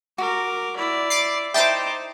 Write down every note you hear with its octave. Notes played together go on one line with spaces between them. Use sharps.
F#4 A#4 D6
E4 D5
D6 A6 C7
D#4 E4 C5 D5 G5 A5 D6 D#6